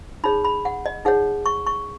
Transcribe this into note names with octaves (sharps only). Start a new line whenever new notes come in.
D#4 G#4 C#5 B5
B5
F#5
D#5
D#4 G#4 C#5 F#5
C#6
C#6